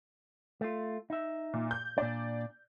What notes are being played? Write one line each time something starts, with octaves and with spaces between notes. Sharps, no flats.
A3 F4
D#4 E5
A#2
G6
A#2 D4 D5